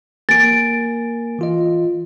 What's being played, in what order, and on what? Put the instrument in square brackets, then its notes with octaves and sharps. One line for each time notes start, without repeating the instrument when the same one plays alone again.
[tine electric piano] A#3 A#4 G#5 [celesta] A6 D7
[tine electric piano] E3 F4 D#5